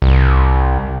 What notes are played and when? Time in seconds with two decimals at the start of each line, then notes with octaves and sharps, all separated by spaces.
0.02 C2